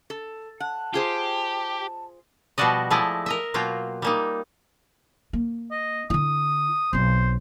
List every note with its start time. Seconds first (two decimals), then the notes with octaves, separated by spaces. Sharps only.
0.10 A4
0.60 F#5 A5
0.94 F4 G4 G#4 C5
2.58 B2 F3 G3 F#4 D5 D#5
2.90 F3 G#3 A3 E4 D5 D#5
3.26 A#4 D#5 E5
3.54 B2 F#3 A#3 F4 G5
4.02 G3 A#3 D#4
5.33 A#3
5.71 D#5
6.10 D3 E4 D#6
6.93 B1 C4 C5